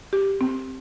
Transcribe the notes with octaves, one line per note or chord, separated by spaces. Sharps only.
G4
C4